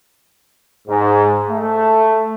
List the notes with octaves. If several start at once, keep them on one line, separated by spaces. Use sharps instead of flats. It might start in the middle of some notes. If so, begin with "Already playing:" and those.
G#2
A3